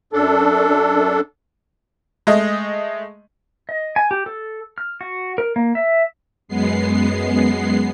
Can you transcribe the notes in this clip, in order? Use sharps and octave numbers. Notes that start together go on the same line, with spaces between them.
F#2 D4 A4
G#3 A3 D#5
D#5
G#5
G4
A4
F6
F#4
A#4
A#3
E5
F#2 G#3 B3 C7